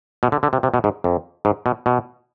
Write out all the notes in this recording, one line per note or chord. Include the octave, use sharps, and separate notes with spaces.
B2
D3
D3
C3
C3
B2
G#2
F2
G#2
B2
B2